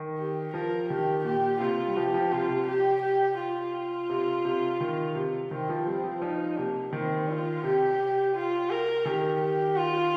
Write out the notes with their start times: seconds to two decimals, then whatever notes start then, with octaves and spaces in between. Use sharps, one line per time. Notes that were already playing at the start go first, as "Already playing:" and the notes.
Already playing: D#3
0.18 G4
0.54 F3 A#4
0.90 D#3 G4
1.25 A#2 G4
1.61 C3 F4
1.88 G3
1.96 F3 G4
2.14 F3
2.32 C3 F4
2.49 C3
2.67 G4
3.02 G4
3.38 F4
4.10 C3
4.45 C3
4.81 D#3
5.15 C3
5.51 D#3 C4
5.69 F3
5.87 G3 C4
6.04 F3
6.22 F3 D#4
6.58 C3 A#3
6.93 D#3 C4
7.29 F4
7.63 C3 G4
8.35 F4
8.70 A#4
9.05 D#3 G4
9.41 G4
9.76 F4